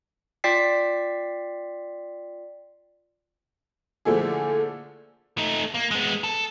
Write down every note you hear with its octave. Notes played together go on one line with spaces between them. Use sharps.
F4 D5 G5 B6 C7
A#2 D3 F3 A3 E4 G#4
A3 D#4
A#3
G#3 B3
A4